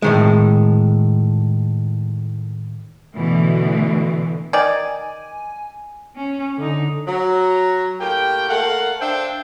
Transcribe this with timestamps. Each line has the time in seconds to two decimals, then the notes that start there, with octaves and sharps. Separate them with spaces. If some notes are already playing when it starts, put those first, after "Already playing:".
0.02 A2 D#3 G#3
3.15 B2 D3 E3 A3
4.53 D#3 D5 G#5
6.16 C#4
6.58 D3 D#4
7.07 F#3 A#5
8.01 A2 A#3 G4 G5
8.49 A3 A#3 A#4 F5 F#5
9.00 D4 C5 E5 F5 G5